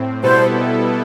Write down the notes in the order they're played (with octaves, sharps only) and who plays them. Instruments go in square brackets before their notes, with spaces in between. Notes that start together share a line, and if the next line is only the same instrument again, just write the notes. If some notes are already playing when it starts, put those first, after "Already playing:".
Already playing: [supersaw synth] A2 C4
[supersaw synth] B2 G3 B3 E4 A4 [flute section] C5